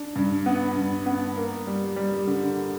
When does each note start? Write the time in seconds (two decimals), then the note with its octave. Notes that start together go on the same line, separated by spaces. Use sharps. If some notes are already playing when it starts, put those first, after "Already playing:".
Already playing: D4
0.16 G2
0.46 B3
0.76 G2
1.06 B3
1.37 A#3
1.67 G3
1.96 G3
2.27 D3